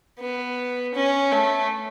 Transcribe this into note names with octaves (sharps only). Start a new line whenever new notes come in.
B3
C#4
A3